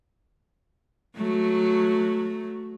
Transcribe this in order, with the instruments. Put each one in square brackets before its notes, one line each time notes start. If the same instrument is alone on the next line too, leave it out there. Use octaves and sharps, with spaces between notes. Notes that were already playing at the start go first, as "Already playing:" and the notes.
[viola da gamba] F#3 A3